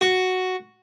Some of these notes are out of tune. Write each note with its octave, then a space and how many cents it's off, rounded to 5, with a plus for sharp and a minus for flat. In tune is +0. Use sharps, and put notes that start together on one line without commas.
F#4 +0